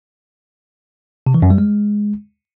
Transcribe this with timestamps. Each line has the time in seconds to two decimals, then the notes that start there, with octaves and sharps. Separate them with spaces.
1.26 C3
1.34 E3
1.42 F#2
1.50 G3
1.58 G#3